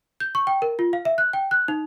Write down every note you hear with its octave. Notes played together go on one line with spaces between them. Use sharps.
G6
C#6
G5
A#4
F4
F5
E5
F#6
G5
F#6
D#4